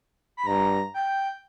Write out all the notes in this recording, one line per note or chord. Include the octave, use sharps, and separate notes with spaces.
B5
G2 A#5
G5